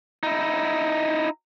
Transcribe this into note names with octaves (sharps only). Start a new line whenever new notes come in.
D#4 E4